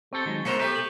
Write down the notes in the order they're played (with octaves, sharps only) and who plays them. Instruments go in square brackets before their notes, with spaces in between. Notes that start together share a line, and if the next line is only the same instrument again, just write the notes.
[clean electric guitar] C4 G4 A4 [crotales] C#6 C#7 G7
[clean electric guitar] D#3 F#3 G#3
[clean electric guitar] B2 [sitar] G#3 A#4 C5 [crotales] C#7 E7 F7
[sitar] A3 G4 [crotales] C#6 G6 B6
[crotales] G6 F#7